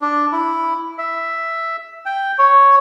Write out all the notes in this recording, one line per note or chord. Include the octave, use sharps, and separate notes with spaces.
D4
E4
E5
G5
C#5